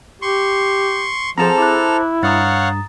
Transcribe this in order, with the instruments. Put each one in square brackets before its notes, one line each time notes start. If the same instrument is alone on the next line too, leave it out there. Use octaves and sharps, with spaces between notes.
[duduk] G4 [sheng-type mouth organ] C6 C#6
[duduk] F3 [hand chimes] C4 G#4 [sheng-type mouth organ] A4 F6 [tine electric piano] C5 A5 A#5
[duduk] E4 [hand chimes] D6 F#6
[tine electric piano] G2 [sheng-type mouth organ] C#5 F5 F#5 [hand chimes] A#5 D#6 A6